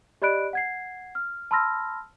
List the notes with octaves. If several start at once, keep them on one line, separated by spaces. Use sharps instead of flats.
G4 D5 D#5 B5 F#6 D7
F#5 G#6 C7
F6
A5 B5 C6 E6 F6 A#6